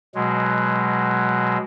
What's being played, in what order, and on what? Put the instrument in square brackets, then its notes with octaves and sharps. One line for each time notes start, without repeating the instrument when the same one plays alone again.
[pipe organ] B2 F#3 G#3